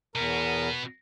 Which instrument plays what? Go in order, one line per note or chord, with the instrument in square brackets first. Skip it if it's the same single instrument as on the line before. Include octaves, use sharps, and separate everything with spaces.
[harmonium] E2 A#4 A#5 [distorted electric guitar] B2 B3